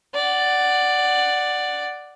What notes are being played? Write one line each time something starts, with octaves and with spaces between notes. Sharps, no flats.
D5 F#5